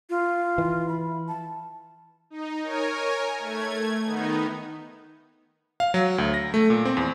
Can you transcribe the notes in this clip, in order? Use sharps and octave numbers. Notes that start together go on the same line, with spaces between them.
F4
E3
B5
A5
D#4
A#4 C#5 G#5
A3 G#6
D#3 B3 D#4
F5
F#3
D2
A#6
A3
A#2
C4
E2